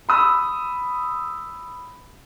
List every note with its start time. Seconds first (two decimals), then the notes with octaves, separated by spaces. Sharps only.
0.09 B5 D#6 E6